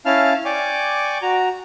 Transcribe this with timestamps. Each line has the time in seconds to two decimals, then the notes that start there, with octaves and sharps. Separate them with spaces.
0.05 C#4 E4 F5 A5 F6
0.45 D5 G5 G#5 C#6 D6
1.22 F#4 A#5